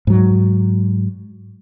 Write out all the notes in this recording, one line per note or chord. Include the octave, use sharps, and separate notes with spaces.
G#2 F#3